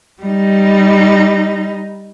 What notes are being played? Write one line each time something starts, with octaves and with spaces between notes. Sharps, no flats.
G3 D#4